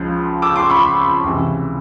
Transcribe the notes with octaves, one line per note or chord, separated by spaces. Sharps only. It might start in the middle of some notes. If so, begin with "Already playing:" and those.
Already playing: C#2 C#3 F3
D6 E6
C6 D6
B5 C#6
C#2 C3 E3